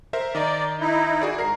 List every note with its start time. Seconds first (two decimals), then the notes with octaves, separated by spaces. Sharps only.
0.13 A#4 C5 E5
0.35 D#3 D5 D#5 A#5
0.80 D#4 E4
1.21 F#4 G#4 D5
1.38 G#2 A#4 A#5 C7